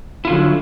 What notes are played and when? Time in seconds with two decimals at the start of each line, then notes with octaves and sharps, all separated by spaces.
0.25 E4
0.27 F4
0.30 D3
0.32 F#3